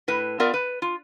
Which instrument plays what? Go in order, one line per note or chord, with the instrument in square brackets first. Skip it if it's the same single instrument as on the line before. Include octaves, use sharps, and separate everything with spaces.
[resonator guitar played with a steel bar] A2 B4
B3 F4 A#4 D5 E5
B4
F4